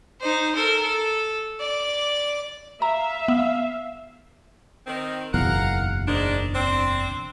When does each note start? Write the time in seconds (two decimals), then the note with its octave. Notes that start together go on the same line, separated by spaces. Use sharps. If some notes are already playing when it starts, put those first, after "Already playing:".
0.20 D#4 C5
0.55 A4 A#4
0.83 A4
1.60 D5 D6
2.82 E5 F5 A#5
3.28 B3
4.87 D#3 C4
5.34 F#1 B1 E2 A#4 F5 F#5
6.08 G#2 D#3 D4
6.55 C4 D4